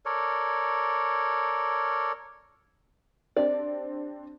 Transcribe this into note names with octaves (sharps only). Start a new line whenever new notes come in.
A4 A#4 C#5 D5
C4 D4 G4 D5